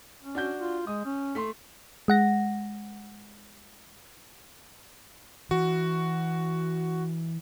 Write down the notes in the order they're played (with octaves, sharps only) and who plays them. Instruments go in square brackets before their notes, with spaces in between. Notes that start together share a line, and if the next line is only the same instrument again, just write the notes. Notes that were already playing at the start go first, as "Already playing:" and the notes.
[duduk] C#4
[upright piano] D4 F#4 G6
[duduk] F4
[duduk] G#3 [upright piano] D#6
[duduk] C#4
[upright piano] A3 C6
[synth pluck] G#3 F#5 A#6
[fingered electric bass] E3 [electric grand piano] F#4